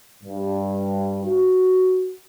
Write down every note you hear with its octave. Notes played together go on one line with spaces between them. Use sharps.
G2
F#4